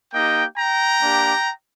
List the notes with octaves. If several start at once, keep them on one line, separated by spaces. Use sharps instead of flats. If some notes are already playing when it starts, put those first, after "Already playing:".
A#3 D#4 G4 D#5 G5
G5 A#5
A#3 D4 G4